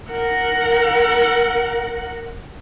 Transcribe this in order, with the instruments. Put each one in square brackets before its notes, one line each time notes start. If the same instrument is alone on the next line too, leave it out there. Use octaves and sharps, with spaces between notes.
[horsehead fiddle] A#4 F#5